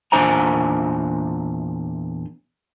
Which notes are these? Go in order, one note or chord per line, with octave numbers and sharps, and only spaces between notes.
E2 A#2 D4 C5 G#5 A#5